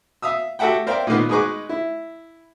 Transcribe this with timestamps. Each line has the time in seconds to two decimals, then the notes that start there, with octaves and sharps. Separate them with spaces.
0.22 E5 F5 D#6 E6
0.59 F#4 G4 A4 E5 F#5 G5
0.87 A#4 C5 D5 E5 F5 G5
1.07 A#2 D#3 A#3 B3
1.29 G#3 D#4 G#4 B4 C#6 D6
1.69 E4